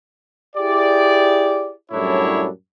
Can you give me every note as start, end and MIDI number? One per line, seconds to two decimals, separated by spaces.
0.56 1.72 64
0.56 1.72 67
0.56 1.72 68
0.56 1.72 74
1.91 2.48 42
1.91 2.48 45
1.91 2.48 55
1.91 2.48 62
1.91 2.48 64
1.91 2.48 73